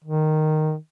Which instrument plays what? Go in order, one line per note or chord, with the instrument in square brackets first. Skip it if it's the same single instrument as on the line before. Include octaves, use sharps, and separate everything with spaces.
[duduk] D#3